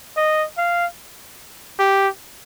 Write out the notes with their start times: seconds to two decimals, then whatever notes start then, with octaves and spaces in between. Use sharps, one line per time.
0.17 D#5
0.58 F5
1.79 G4